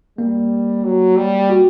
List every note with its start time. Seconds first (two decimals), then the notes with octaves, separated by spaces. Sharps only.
0.18 G3 A#3
0.84 F#3
1.17 G3
1.50 F#4